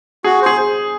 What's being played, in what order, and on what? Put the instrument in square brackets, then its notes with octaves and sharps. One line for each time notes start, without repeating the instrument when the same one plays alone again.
[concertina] F#4 [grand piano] G#4
[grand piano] G#4 [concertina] C5